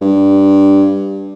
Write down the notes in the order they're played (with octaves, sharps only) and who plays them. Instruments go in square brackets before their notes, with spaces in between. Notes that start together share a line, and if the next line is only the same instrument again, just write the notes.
[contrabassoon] G2